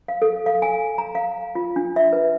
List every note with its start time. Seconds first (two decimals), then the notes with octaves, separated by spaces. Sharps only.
0.08 F5
0.22 A4
0.46 F5
0.62 G#5
0.98 A#5
1.15 F5
1.55 F4
1.76 D4
1.96 E5
2.13 B4